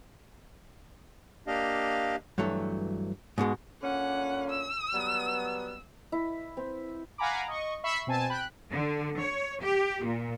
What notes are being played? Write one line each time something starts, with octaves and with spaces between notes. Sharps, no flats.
A#3 D4 G4 D#5 F5
G2 E3 F#3 A3
G#2 B2 G#3
A#2 D3 C#4 F#5
E6
F#3 G3 B3
E4
C4
F5 F#5 G#5 A#5 B5 D6
D#5 C#6
E5 B5 C#6 E6 C7
B2 C4 G#5 A5
G5 B5 F#6
D3
C#5
G4
A#2